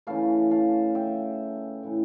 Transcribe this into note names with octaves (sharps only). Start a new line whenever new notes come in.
C#3 E3 A3 F5 A5
F5 A5
E5 G5
A2 E3 A3